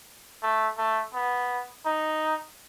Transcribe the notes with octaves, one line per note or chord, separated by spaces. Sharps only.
A3
A3
B3
D#4